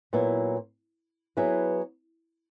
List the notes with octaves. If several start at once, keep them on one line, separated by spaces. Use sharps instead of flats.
A#2 F#3 B3 E4
F#3 B3 E4 G#4 B4